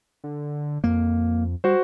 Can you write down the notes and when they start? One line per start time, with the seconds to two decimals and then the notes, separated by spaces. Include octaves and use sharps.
0.24 D3
0.84 F2 A#3
1.64 G3 F#4 C5